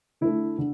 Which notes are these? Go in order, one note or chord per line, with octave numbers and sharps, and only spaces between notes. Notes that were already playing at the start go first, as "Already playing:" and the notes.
D3 A3 E4
D3